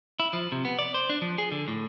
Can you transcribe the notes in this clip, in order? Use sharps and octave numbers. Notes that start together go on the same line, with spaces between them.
E4
F3
C3
B3
D5
C5
D4
F3
G#4
D3
A2